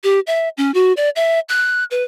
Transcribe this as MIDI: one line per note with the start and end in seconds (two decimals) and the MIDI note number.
0.04 0.20 67
0.27 0.49 76
0.57 0.71 61
0.74 0.93 66
0.97 1.09 74
1.16 1.40 76
1.49 1.84 90
1.91 2.04 71